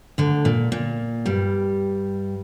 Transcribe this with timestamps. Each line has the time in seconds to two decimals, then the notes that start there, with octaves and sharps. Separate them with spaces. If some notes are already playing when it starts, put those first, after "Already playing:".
0.18 D2 D3
0.45 A#2
0.72 A#2
1.25 G2 G3